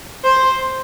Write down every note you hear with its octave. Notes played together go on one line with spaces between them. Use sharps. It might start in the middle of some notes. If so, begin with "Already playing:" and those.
C5